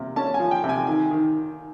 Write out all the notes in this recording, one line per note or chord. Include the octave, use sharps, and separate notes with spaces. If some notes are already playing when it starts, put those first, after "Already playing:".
Already playing: C3 A#3
C#4 A5
G#5
F3
G5
C3
G#5
D#3 G#5
D#3